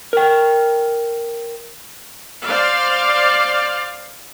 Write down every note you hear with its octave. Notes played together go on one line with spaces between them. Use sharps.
A#4 G5
C5 D5 F5